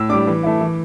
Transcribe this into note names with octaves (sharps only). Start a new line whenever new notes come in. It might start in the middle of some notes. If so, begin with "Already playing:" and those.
Already playing: A2 E6
G3 D4 D6
E3
A3 E4
E3